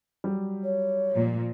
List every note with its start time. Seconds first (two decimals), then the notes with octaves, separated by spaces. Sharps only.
0.24 F#3 G3
0.64 C#5
1.11 A#2 F3